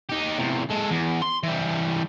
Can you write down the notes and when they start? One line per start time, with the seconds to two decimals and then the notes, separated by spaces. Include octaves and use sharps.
0.09 D#4 G4
0.39 E2 C3
0.71 G#3 A4
0.91 E2
1.22 C6
1.43 E3 G3